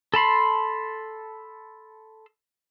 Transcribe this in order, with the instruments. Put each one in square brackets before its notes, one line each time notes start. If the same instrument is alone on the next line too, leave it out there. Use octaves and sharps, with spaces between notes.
[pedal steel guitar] A4 A5 B5 C6